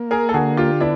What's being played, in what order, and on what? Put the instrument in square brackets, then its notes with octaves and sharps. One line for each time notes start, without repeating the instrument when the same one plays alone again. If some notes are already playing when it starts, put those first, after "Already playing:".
Already playing: [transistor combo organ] A#3
[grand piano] G#4 A#4
A4
[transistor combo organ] D3 [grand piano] F#4 G#4
[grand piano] F4 G4
[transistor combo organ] B3 [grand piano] D4 E4